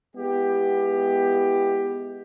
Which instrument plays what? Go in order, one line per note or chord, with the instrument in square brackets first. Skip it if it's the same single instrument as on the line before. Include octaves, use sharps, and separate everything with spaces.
[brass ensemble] G#3 B3 E4 G4